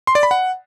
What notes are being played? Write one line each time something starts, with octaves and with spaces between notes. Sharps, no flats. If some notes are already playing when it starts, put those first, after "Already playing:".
C6
D5
B5
F#5